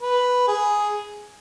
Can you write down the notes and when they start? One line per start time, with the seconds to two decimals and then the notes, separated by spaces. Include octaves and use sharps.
0.02 B4
0.48 G#4